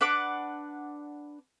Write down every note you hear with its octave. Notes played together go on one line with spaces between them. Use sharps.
D4 B4 F#5 D6